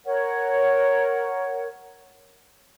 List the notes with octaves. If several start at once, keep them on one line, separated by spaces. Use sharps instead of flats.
A#4 C#5 F#5